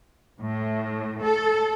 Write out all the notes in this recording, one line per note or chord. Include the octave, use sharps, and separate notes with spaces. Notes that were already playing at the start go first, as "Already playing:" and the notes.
A2
A4